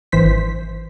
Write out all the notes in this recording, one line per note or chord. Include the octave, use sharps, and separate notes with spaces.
G#1 E3 C5 B6